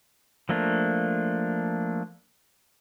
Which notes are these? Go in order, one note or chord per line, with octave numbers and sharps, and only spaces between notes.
F3 A3 A#3 D4